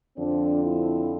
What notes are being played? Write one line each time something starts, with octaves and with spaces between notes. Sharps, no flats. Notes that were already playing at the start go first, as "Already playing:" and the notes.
F2 D3 F3 C4 D4
E4